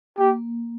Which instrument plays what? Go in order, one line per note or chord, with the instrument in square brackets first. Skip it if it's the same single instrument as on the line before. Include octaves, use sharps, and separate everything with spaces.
[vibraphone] A#3 [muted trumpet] G4